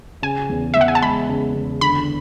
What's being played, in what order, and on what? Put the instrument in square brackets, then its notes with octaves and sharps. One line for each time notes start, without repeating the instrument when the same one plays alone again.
[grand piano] C#3 [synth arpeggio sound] G#5
[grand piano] E2
[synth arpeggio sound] E5
[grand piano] E2 [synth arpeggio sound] F#5
[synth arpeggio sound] G#5
A5
[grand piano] G#3 [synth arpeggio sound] B5
[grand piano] C#3
E2
[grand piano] D3 [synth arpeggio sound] B5